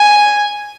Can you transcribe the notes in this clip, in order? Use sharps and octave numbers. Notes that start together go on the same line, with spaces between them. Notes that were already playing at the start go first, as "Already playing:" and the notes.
Already playing: G#5